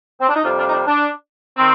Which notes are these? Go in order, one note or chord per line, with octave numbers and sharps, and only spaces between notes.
C4
D4
D#4
F2 C3 G3 A#3 D4 F4
D4 F4
D#4
D4
D4
D#3 C4